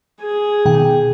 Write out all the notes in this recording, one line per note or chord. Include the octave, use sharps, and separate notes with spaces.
G#4
B2 D#3 G5